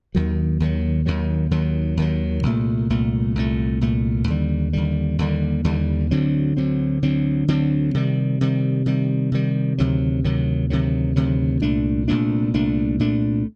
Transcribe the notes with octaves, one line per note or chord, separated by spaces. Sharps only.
D#2 D#3 F#3
D#2 D#3 F#3
D#2 D#3 F#3
D#2 D#3 F#3
D#2 D#3 F#3
C2 A#2 A3
C2 A#2 A3
C2 A#2 A3
C2 A#2 A3
D#2 D3 G3
D#2 D3 G3
D#2 D3 G3
D#2 D3 G3
D2 D3 F#3 C4
D2 D3 F#3 C4
D2 D3 F#3 C4
D2 D3 F#3 C4
C3 D#3 G3
C3 D#3 G3
C3 D#3 G3
C3 D#3 G3
D2 C3 D#3 F#3
D2 C3 D#3 F#3
D2 C3 D#3 F#3
D2 C3 D#3 F#3
C2 A#2 A3 D4
C2 A#2 A3 D4
C2 A#2 A3 D4
C2 A#2 A3 D4